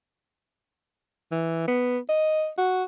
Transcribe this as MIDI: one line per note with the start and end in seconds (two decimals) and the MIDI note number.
1.32 1.65 52
1.68 1.98 59
2.09 2.49 75
2.58 2.84 66